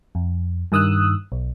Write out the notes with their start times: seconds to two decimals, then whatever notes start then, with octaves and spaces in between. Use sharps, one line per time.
0.15 F2
0.72 G2 D#3 D#6 E6 F#6
1.32 B1